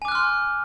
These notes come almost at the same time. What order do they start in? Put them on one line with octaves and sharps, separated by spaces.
G#5 D6 F#6 F6 C6